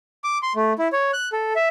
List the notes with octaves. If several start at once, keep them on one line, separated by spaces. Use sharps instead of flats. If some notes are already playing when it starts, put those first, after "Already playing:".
D6
C6
A3
E4
C#5
F#6
A4
E5